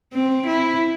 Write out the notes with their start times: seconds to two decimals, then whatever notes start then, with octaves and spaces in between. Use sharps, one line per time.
0.13 C4
0.47 E4